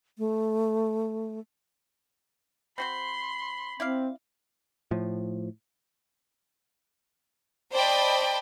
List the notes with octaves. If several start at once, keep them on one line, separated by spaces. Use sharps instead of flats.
A3
C4 F#4 C5 B5 C6
C4 E4 D5 F5
A2 F3
C5 D5 D#5 G5 A5 B5